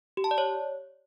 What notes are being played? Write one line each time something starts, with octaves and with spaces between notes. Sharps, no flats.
G4
A5
D5
C#5